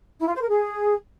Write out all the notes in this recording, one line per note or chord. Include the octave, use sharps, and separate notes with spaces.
E4
F4
C5
A#4
G#4